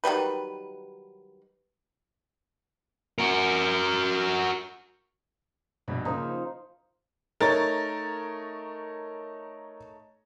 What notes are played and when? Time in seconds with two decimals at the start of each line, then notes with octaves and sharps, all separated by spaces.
0.04 D#3 F#3 G3 B4
3.19 F#4 A#4
5.88 A#1 G2 B2
6.05 C#3 F3 A#3 D#4
7.40 A3 D#4 A#4 C#5 A6